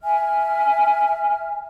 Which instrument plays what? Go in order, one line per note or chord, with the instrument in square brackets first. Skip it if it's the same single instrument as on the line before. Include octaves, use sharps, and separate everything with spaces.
[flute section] E5 G#5 F6